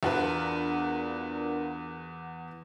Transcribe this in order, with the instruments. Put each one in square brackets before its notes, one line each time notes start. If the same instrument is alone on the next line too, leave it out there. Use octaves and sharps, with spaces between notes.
[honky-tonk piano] E2 F#4 B4 [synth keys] D4 F4 A#4